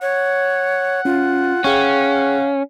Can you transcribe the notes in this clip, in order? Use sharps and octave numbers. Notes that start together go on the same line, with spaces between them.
C#5 F#5
C#4 F4
C#4 G#4 F5 G5 C#6